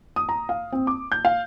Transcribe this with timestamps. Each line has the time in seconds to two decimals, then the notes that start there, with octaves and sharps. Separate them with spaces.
0.16 D#6
0.29 A#5
0.49 F5
0.72 C4
0.87 D6
1.12 G6
1.25 F5